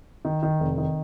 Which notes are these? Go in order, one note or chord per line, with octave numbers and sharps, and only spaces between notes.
D#3
D#3
F1
D#3